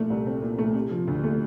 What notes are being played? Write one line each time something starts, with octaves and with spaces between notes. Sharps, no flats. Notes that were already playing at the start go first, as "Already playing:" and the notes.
Already playing: A#2 A3
C2
C4
A#2
A3
C3
F3
D2
A3